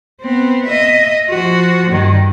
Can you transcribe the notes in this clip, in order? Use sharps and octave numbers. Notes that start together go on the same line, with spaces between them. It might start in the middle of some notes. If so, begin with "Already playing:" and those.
B3 C4
D#5 E5
F3 F#4
G2 D#3